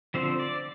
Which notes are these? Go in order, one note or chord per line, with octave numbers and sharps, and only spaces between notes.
D3 F3 C4 C5
D5